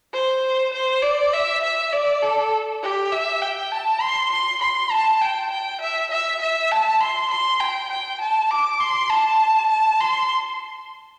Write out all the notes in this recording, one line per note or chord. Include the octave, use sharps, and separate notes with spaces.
C5
C5
D5
E5
E5
D5
A4
G4
E5
G5
A5
C6
C6
C6
A5
G5
G5
E5
E5
E5
A5
C6
C6
G5
G5
A5
D6
C6
A5
A5
C6